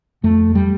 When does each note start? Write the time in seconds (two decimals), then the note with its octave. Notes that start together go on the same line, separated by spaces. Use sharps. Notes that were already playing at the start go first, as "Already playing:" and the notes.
0.23 F2 A3
0.55 G3